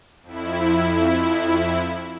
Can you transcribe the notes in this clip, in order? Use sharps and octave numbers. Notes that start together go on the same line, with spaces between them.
F2 E4